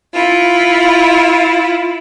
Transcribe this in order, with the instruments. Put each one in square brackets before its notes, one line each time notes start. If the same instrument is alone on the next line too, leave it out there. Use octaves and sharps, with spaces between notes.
[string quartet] E4 F4